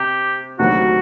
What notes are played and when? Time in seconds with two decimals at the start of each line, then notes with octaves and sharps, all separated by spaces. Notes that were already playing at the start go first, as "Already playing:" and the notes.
Already playing: C3 G4
0.59 D2 C3 D#3 F#3 F#4